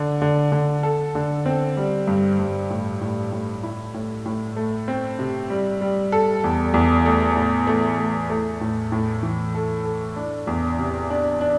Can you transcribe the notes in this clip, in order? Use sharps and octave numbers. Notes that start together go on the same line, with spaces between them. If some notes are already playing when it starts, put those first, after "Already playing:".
Already playing: D3
D3
D3
A4
D3
C4
G3
G2
G2
A2
A2
A2
E4
A2
A2
A3
C4
C3
G3
G3
A4
E2
E2
A3
A2
A3
A3
A3
A2
A2
E3
A4
A4
D4
E2
C3
D4
D4